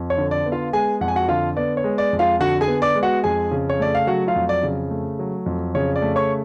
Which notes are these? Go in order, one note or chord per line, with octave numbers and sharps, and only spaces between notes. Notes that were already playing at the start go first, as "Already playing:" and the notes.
Already playing: F2
C#5
D3
D5
B3
F4 F5
G#3 G#4 G#5
F2 F#5
G#5
F#4 F#5
D3 F4 F5
B3 D5
C#5
G#3
D5
F2
F4 F5
D3 F#4 F#5
G#4 G#5
B3
D5 D6
G#3
F#4 F#5
F2 G#4 G#5
C#3
C#5
A3 D5
F5
F#3 F#4 F#5
F4 F5
F2
D5
C#3
A3
F#3
F2
C#3 C#5
D5
A3
C#5 C#6